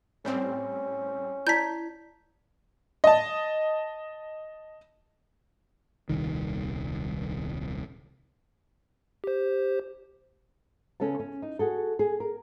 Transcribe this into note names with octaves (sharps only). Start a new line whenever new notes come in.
A2 G3 C4 C#4
E4 D5 A5 G6 B6
D#5 A5
D#1 C2 D#3
G4 C5
C#3 C#4 A4 B4 A5
C#4
D#4
F#4 G#4 A4
G#4
A#4